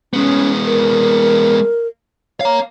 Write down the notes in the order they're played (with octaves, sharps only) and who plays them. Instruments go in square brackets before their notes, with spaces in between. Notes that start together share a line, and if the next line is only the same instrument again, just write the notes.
[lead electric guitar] G#3 B3 [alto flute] C#4
[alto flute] A#4
[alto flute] C#5 [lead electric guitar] F5 A#5